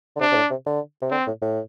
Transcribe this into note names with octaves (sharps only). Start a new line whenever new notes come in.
D3
C3 D4
C3
A2
C3
D3
C3
D3 C4
A2
A2